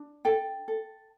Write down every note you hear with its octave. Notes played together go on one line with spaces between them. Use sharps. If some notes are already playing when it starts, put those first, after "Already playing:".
Already playing: D4
A4 G5
A4